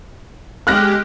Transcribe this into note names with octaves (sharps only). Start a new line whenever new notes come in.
G#3 G4 F6 F#6 A#6